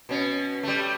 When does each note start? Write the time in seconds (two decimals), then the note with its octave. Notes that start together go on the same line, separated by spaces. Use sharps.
0.09 B2 C#4
0.63 G3 A3